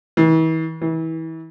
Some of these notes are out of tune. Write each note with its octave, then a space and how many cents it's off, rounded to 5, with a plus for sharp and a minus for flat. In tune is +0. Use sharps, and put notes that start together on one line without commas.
E3 -40
E3 -30